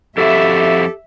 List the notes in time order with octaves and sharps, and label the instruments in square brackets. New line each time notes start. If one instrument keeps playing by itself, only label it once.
[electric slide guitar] F2 E4 F#4 [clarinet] G4 [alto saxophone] A4 [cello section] E5